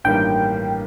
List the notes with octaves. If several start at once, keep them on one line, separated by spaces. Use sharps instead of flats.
A1 G2 D#3 G3 A#3 G5